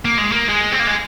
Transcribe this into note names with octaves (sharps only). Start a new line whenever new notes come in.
A#3
G#3
A#3
G#3
C4
A#3
G#3